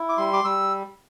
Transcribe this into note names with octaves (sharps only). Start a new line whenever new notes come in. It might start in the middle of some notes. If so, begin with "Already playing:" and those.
Already playing: E4
D6
G3 C6
D6
G3 E6